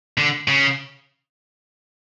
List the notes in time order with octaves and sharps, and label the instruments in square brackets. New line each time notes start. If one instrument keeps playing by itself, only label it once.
[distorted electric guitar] D3
C#3